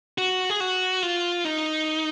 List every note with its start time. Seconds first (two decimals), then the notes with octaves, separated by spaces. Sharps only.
0.18 F#4
0.50 G#4
0.60 F#4
1.03 F4
1.45 D#4